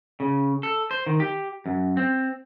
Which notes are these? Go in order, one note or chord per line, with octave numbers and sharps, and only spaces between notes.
C#3
A4
C5
D#3
G4
F#2
C4